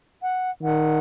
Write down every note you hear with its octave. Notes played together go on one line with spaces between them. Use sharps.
F#5
D#3 F#5